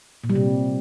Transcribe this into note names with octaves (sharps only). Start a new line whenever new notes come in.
A#2
G3
C3